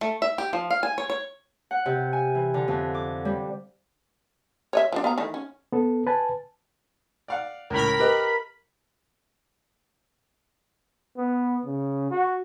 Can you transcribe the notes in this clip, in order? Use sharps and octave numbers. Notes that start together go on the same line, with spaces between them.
A3
E5
G4
F3
F5
G#5
C#5
C#5
F#5
C3
G#5
E3
D3
F2
D6
G3
C#5 D#5 E5
F3 D4
B3 F5 A#5
D#3 E3 A3
C#4
B3 A4
B4 G#5 A5
D5 F5 F#5
C#2 A2 A#4 B5
G4 B4 D#5
B3
C#3
F#4